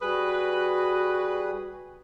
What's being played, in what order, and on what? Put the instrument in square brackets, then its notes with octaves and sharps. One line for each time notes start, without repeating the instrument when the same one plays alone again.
[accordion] G3 G#4 D#6 [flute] F#4 [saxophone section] B4